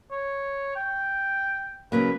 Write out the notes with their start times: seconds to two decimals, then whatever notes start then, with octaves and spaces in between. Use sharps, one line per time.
0.11 C#5
0.76 G5
1.92 C#3 F#3 A#3 B4